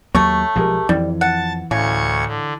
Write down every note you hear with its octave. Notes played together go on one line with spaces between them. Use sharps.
D#2 F#3 A3 A#3 C#5
B1 F3 G#3 G4 G#4 A#4
F2 E3 G3
F#5 A5
D2 A2 C#3 C#6 G#6
D3